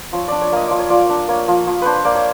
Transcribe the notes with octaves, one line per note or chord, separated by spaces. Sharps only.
F3 C#5
D4 D5
C#5
A#3 D#5
F3 D5
C#5
F3 D5
D4
A#3 C#5
F3
F3
D4 B4 C5
A#3 D5
C#5